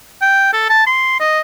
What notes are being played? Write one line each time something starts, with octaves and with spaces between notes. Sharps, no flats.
G5
A4
A5
C6
D#5